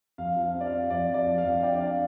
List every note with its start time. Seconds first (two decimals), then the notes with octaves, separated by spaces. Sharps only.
0.18 F2 F5
0.36 F3
0.42 F5
0.54 C4
0.61 D5
0.67 C4 F5
0.90 F2 D5
1.09 F2
1.14 D5
1.27 F3
1.38 F5
1.44 F2
1.57 F5
1.62 D4 D5 G5
1.75 D5
1.80 D4 F5